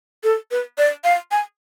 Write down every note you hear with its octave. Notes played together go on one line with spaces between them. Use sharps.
A4
B4
D5
F5
G#5